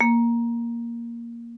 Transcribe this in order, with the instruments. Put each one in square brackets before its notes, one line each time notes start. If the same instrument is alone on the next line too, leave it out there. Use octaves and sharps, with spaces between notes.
[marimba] A#3